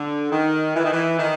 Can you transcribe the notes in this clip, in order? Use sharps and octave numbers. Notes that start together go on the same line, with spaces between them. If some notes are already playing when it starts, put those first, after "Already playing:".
Already playing: D3
D#3
E3
D#3
E3
D#3